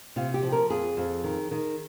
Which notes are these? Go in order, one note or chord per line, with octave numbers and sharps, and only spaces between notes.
C3 F4
G4
F3
A#4
F2 G#4
F2
D#3
D#3